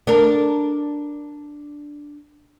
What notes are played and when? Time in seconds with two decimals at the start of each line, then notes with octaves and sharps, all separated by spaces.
0.07 D4 A#4